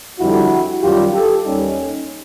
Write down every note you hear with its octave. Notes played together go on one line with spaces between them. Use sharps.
F2 D3 G3 E4 F#4
F#2 D#3 G3 F4 G4
G4 A4
D#2 D#3 G3 C#4 D#4